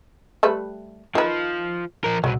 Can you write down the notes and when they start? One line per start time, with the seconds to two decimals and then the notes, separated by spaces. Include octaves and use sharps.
0.43 G3 A3 B4
1.15 D#3 F3 B4
2.04 F3 A#4
2.24 C2 B2 F#3